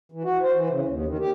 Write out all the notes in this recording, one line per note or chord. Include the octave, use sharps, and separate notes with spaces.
E3
F#4
C5
E3
C#3
D#2
D#3
G4